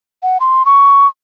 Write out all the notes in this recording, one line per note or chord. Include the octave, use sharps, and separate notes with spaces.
F#5
C6
C#6